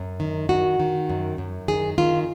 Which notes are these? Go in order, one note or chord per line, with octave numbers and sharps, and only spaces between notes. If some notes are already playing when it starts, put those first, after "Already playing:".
Already playing: F#2
D#3
D#3 F#4
D#3
F#2
F#2
D#3 G#4
D#3 F4